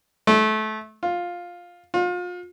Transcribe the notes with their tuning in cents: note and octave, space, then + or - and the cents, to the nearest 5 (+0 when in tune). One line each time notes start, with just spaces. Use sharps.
A3 -25
F4 +10
F4 +35